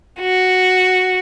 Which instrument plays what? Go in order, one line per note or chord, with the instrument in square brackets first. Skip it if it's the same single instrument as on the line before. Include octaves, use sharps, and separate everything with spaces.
[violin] F#4